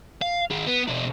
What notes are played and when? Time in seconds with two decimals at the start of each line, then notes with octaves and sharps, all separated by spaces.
0.22 F5
0.51 D#3 G#4
0.67 B3
0.88 B2 D4